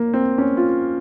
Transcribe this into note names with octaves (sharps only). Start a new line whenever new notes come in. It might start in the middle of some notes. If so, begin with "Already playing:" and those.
Already playing: A#3
C4
C#4
F4